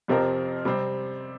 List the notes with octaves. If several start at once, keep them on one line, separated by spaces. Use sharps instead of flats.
F2 C3 F3 C4 A#4
C3 G3 C4